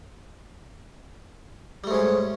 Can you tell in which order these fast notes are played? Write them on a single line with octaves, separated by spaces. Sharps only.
G3 A3 G#2 C#4